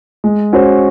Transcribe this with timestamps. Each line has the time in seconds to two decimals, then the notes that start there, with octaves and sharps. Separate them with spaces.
0.24 G#3
0.53 C#4 F#4 C5